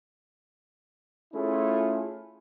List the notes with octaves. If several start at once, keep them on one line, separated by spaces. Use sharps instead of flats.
A3 C#4 E4 F4 G#4